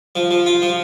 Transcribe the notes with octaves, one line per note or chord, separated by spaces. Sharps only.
F3
F3
F4
F3